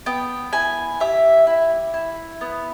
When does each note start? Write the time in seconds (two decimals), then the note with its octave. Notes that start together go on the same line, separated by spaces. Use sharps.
0.06 B3 G5
0.53 E4 G#5
1.00 G4 E5
1.47 E4
1.94 E4
2.41 B3